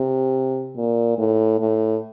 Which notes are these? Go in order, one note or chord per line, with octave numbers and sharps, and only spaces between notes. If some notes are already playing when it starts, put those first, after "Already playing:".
Already playing: C3
A#2
A2
A2